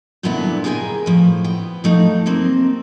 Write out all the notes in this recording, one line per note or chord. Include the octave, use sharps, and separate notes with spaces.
G2 A#2 D3 B3 D4 E4
G#4 A#4 C5 F5 G5 G#5
A2 F3
B3 G5
F3 A3 D#4
C3 A#3 C4